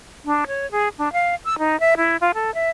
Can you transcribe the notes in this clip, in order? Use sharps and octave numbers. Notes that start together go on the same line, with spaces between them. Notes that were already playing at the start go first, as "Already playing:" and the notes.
D4
C#5
G#4
D4
F5
E6
D#4
E5
E4
F4
A4
E5